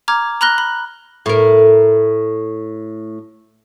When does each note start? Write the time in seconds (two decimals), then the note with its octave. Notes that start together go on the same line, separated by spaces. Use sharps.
0.08 A#5 D6 F6 G#6
0.41 A#5 B5 F6 F#6 A#6 G7
0.58 B5
1.26 A2 A#4